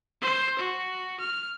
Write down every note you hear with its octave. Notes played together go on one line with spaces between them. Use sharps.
C5
F#4
F6